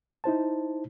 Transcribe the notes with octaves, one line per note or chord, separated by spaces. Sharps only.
D#4 E4 C5 A5